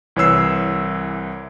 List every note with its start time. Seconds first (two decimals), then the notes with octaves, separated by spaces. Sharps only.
0.16 C2 E3 C#5 E6 C7